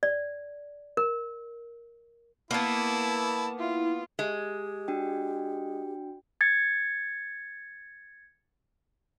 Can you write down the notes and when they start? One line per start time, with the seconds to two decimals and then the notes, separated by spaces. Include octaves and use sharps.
0.03 D5
0.97 A#4
2.51 A#3 B3 E4 A5
3.59 E4 F4
4.19 G#3 G4
4.88 D4 F#4 G5
6.41 G#6 A6 C#7